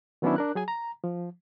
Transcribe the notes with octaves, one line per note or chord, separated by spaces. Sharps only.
D#3 F#3 B3 C#4 D4 E4
D4 A#4 F#6
F#3 G#4 G#5
A#5
F3